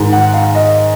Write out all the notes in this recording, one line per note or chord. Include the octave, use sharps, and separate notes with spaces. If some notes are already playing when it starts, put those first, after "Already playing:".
Already playing: G#2 D#3
F#5
F5
D#5